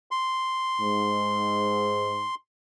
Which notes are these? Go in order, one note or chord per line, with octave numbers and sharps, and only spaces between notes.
C6
G#2